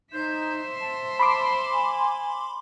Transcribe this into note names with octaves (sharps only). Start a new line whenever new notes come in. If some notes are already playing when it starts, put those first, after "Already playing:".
D#4 C5 E5 G6
A5
B5 C6 D6
G#5